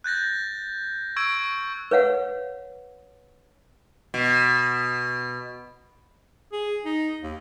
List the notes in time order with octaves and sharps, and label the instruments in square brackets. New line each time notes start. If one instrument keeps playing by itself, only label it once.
[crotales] F#6 G6 A6 A#6
C#6 E6 G#6 D7
[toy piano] B4 C#5 F5 F#5
[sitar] B2
[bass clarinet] G#4
D#4
D#2